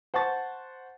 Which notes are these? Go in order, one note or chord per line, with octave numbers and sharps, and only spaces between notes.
C5 F#5 A5 C#6 A6